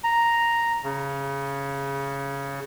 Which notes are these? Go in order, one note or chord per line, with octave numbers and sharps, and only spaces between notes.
A#5
C#3